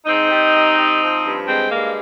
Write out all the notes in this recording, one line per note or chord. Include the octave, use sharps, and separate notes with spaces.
G#2 C4 D#4
G3
G3
G3
F3
G2
G#3 C4
G2 A#3